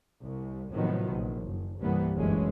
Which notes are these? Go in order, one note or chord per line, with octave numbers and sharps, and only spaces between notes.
C2
A2 C3 D#3 F3 F#3 B3
A#1
F#1
C2 G2 E3 G3 A#3 B3
F#1 D2 G#2 E3 G#3 C#4